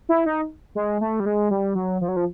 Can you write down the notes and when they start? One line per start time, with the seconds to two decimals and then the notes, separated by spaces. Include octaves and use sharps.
0.09 E4
0.26 D#4
0.75 G#3
1.01 A3
1.20 G3
1.26 G#3
1.51 G3
1.75 F#3
2.01 F3
2.08 F#3
2.16 F3